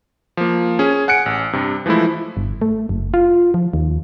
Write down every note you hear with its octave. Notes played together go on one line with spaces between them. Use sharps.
F3 A#3
C#4 G#4
F#5 G#5 F#6 C#7 D7
A1
G2 C3
E3 F3 G#3 A3 E4
G1
A3
F#1
F4
F3
D#2